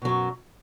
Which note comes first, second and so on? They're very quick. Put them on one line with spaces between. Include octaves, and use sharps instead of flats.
B2 F#3 F#2